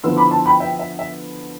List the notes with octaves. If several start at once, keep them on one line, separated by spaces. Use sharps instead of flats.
D3 F3 B3 E4 C6 E6
B5 D6
A5 C6
G5 B5
E5 G5
E5
E5